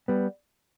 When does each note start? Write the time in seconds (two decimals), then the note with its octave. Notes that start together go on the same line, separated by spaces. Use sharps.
0.08 G3 B3